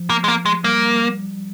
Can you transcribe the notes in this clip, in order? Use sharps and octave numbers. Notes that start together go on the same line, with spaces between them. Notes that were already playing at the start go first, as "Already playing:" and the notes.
Already playing: F3
A#3
G#3
A#3
G#3
G3 A#3